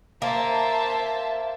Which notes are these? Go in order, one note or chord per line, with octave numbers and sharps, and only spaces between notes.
A#3 C5 E5 A5